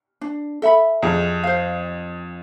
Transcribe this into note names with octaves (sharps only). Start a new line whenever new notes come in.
D4
A4 E5 B5
F2 G#4
C5 F5